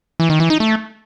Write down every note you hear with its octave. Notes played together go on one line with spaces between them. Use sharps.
E3
D#3
E3
D#4
A3